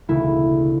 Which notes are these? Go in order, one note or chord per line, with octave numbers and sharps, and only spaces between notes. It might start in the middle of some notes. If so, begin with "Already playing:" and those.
E1 D2 C#3 E4